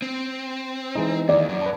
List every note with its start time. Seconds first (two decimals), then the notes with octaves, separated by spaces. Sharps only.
0.02 C4
0.95 E3 G#3 D#4
1.29 D#2 D5
1.49 F#2
1.61 B4 A5